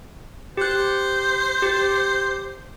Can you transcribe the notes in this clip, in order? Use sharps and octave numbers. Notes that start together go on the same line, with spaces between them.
G4 C5 F#6
G4